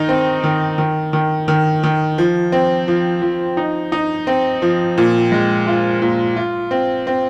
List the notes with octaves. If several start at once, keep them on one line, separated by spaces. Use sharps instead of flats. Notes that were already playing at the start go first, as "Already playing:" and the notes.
Already playing: D#3 D#4
C4
D#3
D#3
D#3
D#3
D#3
F3
C4
F3
F3
D#4
D#4
C4
F3
A#2
G#3
F4
A#2
F4
C4
C4